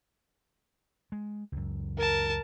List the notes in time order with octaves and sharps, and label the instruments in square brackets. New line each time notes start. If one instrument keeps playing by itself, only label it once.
[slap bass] G#3
C#2 F#2
[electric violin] A#4 A5